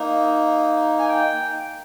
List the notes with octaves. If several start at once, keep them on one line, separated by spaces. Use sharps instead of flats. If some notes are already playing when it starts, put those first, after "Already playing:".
Already playing: A#3 D#4
G#5
G5